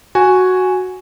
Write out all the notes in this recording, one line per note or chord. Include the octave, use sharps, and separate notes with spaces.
F#4 G#5